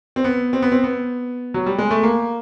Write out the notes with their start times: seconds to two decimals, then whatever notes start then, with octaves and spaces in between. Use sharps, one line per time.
0.16 C4
0.24 B3
0.53 C4
0.62 B3
0.72 C4
0.84 B3
1.54 F#3
1.66 G3
1.78 G#3
1.91 A3
2.03 A#3